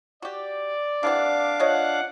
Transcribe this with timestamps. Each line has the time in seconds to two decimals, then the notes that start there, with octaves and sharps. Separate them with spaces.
0.22 F#4 G4 D5
1.03 C3 E3 D4 F5 F#5 D6
1.60 F3 C#5 D#5 F#5